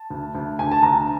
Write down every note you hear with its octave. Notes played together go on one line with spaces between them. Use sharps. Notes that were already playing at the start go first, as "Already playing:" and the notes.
Already playing: A5
D2
D2
D2 G#5
A5
D2 A#5